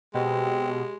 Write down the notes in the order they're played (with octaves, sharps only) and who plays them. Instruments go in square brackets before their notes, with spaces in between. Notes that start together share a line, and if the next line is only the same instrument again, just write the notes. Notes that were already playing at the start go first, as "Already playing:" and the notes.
[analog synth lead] B2 [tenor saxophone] G#3 [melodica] C4 [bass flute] G4